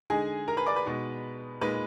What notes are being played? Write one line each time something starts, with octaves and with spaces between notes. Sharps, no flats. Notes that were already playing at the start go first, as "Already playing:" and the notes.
D3 G#3 D#4 G#4 G#5
A#4 A#5
B4 B5
D5 D6
B4 B5
B2 G#3 D#4
A#2 G#3 D#4 B4 B5